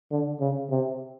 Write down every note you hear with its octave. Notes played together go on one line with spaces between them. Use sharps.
D3
C#3
C3